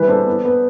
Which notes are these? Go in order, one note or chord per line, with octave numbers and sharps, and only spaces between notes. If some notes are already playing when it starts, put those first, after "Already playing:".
Already playing: E3 G3 B4
D4 A4 C5
B3
B3